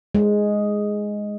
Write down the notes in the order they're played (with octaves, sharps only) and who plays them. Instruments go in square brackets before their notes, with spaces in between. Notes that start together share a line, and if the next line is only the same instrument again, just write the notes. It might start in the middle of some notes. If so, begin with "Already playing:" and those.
[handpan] G#3